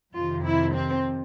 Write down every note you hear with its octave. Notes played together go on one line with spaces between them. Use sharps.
F2 C3 D#3 F4
E4
C4